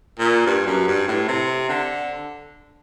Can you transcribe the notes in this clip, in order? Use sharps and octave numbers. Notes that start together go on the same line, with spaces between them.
A#2
G2
F#2
G2
A2
C3
D3